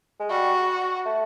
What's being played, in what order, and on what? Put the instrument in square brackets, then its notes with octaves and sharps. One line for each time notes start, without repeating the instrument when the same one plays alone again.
[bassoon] G#3
[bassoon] G3 [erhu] F#4
[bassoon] A3